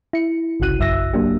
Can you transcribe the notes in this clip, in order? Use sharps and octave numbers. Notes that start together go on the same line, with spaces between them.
E4 C#7
G1 C2 C#3 F#4 F#6 D#7
A#1 F#2 E5 E6 A#6
F#3 A#3 D4 G4